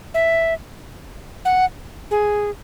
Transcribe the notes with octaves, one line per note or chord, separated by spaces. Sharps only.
E5
F#5
G#4